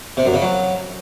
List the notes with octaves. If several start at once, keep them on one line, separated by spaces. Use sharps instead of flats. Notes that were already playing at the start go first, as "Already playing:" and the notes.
C3
F#2
C#3
F#3